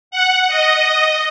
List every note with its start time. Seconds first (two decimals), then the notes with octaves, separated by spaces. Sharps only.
0.11 F#5
0.48 D#5